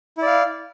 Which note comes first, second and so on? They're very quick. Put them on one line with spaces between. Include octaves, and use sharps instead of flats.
E4 D5 F5